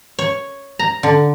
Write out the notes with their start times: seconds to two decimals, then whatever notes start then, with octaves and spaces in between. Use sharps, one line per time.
0.19 C#5
0.79 A#5
1.03 D3